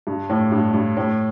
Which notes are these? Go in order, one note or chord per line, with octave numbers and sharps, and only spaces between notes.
G2
A2
G2
G2
A2